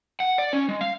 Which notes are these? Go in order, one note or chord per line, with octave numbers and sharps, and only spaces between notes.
F#5
D5
C#4
G#3
F5